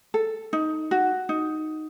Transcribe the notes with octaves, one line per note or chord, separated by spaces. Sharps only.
A4
D#4
F#4
D#4